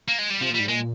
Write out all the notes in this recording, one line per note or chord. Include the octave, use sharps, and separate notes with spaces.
A#3
G#3
G3
C3 F3
A#2
G3
G#2
A#2 G#3